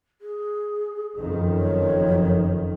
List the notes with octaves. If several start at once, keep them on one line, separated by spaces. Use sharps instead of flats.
G#4
F#1 F2 D#3
C#5